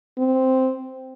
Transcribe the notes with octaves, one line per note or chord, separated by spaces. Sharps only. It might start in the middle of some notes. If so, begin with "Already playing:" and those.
C4